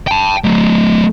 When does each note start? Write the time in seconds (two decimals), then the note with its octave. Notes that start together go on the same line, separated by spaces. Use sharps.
0.07 G5 A5
0.44 F#3 A3